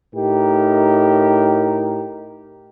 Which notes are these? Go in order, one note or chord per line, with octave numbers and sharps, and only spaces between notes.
A2 D#4 G4 A#4